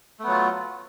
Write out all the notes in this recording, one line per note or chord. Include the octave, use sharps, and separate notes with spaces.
F#3 A3 B3 F4